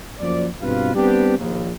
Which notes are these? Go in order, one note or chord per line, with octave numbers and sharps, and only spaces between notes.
F#2 F3 A#3 D5
G2 B2 C4 F4 B4 F5
G3 B3 C4 D4 G4
A#1 D#2